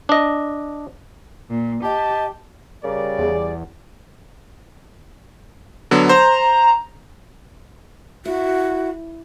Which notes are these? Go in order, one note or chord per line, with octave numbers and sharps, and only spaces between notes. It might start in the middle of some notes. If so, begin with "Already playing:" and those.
D4 D#5
A#2
G4 D#5 A5
C#3 G3 A#4 D5
E2 G#4
D3 F#3 B3
C5 A#5
E4 F#4